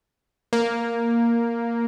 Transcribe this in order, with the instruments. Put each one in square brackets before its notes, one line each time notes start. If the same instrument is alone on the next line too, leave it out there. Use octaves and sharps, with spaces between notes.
[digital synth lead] A#3